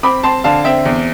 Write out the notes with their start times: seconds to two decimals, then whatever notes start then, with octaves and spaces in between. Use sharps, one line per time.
0.03 C4 B5 D6
0.23 C4 A5 C6
0.44 D3 F5 A5
0.64 C4 E5 G5
0.85 E2